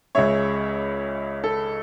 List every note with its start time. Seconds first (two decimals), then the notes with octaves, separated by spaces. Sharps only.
0.15 C#2 C#3 G#3 C#5 E5
1.44 A4